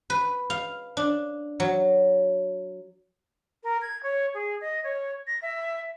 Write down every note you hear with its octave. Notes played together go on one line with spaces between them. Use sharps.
B4
F5
D4
F#3
A#4
G#6
C#5
G#4
D#5
C#5
A#6
E5